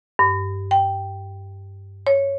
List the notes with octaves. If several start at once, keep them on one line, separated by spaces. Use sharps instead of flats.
G2
G5
C#5